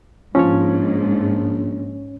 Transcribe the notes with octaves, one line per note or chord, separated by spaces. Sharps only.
A#1 G#2 F3 C#4 C#5